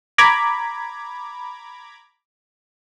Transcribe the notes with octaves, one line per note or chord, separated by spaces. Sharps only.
A#5 B5 D6 G#6